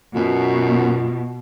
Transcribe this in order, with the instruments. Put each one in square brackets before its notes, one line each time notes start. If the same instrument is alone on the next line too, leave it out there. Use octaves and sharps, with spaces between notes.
[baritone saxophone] F#2 [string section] B2 [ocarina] F4